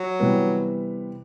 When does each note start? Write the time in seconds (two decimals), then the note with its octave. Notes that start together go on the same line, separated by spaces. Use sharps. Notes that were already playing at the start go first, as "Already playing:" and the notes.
Already playing: F#3
0.19 C3 E3 G3 B3